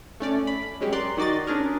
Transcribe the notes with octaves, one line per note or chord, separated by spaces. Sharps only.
A3 C#4 D5
B5
F#3 G#3 C#4 G4
A#4 D5 C6 F#6
D#3 F#4 D5 D#5 A6
C#4 D4 G#4 A#4